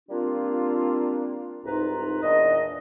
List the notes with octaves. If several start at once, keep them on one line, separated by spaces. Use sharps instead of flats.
G3 A#3 C4 D4 F4
C2 G#2 D#4 F4 B4 A#5
E2 A#2 D4 D#5